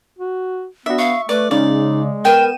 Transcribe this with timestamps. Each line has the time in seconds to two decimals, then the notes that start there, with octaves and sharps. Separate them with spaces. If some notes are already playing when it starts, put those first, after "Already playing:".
0.18 F#4
0.86 B3 D4 F#4 E5
0.99 F5 C#6
1.29 A3 B4 D5
1.51 C#3 G#3 D#4 D5
2.25 B3 A#4 G5 D#7 E7